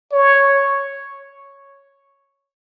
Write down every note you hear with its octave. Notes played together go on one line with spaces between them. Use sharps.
C#5